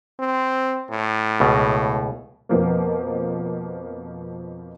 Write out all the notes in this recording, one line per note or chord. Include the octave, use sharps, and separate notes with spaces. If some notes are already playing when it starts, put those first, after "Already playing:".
C4
A2
C#2 B2
F2 B2 F3 A#3